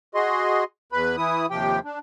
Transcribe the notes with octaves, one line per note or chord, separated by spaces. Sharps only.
F#4 G#4 D#5 C6
E2 B4 B5
E3 E4 D#6
D#2 C3 F3 G4 G5
D4